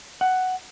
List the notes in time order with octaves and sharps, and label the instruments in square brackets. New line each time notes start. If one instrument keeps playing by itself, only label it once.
[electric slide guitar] F#5